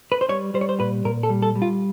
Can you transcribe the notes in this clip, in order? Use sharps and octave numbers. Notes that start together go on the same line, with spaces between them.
B4
C5
G3 C#5
G3 C5
C#5
C5
A#2 B4
A#2 A#4
A4
G3
A4
G3
F4